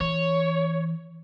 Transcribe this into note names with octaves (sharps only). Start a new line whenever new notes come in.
E3 C#5